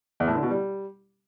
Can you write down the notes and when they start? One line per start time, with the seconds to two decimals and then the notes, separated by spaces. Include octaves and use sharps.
0.20 E2
0.28 A2
0.35 D3
0.43 B2
0.50 G3